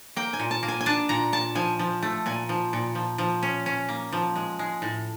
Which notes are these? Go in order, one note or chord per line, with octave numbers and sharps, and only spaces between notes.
A#3 G5
G#5
A#2
A5
A#3
G#5
G#5
D4 A5
A#2 A#5
A#2 A5
F3 G#5
F3
A3
A#2 G#5
F3
A#2
F3
F3
C#4
C#4
A#3
F3
G#3
G#3
A2